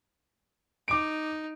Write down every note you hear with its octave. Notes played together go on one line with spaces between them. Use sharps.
D#4 D6 D7